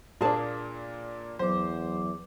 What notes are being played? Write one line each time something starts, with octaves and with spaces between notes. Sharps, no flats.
A#2 A#3 D4 G#4 A5
E2 F#3 C5 D6